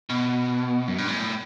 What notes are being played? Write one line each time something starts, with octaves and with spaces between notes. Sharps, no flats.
B2
F#2
G2
A2